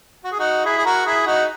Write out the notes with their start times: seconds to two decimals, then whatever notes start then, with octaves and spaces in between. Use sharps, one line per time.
0.24 F#4
0.32 G#4
0.39 D#4 F#4
0.65 E4 G#4
0.78 G#4
0.85 F#4 A#4
1.06 E4 G#4
1.26 D#4 F#4